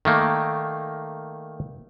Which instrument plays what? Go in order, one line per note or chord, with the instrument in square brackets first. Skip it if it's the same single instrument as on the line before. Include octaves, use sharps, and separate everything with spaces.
[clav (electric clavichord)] D#3 A3 A#3